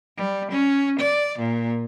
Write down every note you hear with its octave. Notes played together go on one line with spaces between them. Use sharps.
G3
C#4
D5
A#2